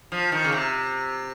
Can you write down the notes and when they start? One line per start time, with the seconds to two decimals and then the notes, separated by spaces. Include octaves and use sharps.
0.12 F3
0.32 D#3
0.44 C#3
0.52 C3